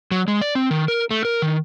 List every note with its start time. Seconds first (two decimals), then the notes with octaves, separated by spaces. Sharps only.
0.11 F#3
0.28 G#3
0.41 D5
0.55 C4
0.71 D#3
0.88 A#4
1.11 A3
1.25 A#4
1.42 D#3